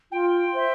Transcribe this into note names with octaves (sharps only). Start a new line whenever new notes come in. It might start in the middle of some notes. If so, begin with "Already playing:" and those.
F4 G5
C5 E5